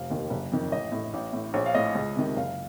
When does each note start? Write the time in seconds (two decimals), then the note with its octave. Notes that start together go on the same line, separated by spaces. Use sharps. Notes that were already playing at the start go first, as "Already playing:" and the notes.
Already playing: F1 F5
0.10 D#2 D#3
0.30 F#1
0.52 F2 D#3
0.72 A1 D#5
0.92 A2
1.14 A1
1.33 A2
1.54 A#1 C#5
1.66 F5
1.75 A2 D#5
1.95 C#2
2.15 C3 D#3
2.36 F#1 F5